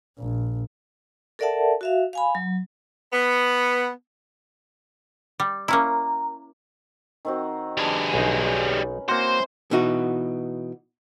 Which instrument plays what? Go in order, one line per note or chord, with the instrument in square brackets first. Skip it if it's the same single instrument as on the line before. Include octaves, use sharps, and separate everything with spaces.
[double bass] A#1
[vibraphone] A4 A#4 D5 E5 F#5 A5
F#4 E5 F5
F5 G#5 B5
F#3
[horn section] B3
[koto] G3
[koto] A#3 C#4 E4 [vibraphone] A#5
[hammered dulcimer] D#3 C4 F#4
[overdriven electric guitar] G3 G#4 [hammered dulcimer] D4 A#4 B4
[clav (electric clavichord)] B1 D#4 [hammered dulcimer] C#4
[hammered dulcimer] E3 C4 [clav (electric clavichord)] A#3 F#4 [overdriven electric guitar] C5
[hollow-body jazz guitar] B2 E3 D#4 F#4